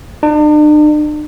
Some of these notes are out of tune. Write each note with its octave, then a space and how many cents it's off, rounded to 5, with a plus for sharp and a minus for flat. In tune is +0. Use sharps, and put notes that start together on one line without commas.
D4 +45